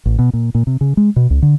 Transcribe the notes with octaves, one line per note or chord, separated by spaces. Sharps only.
A1
B2
A#2
A#2
C3
C#3
G#3
B2
C#2
D3